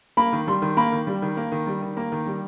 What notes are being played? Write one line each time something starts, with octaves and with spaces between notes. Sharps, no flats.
A#3 B5
D#3
G3 C6
D#3
A#3 B5
D#3
G3
D#3
A#3
D#3
G3
D#3
A#3 A#5
D#3
G3